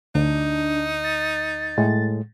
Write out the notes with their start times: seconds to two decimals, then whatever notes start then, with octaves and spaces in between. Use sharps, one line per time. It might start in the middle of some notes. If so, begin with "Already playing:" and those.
0.15 D2 D4 D#4
1.04 A6
1.78 A2 G#3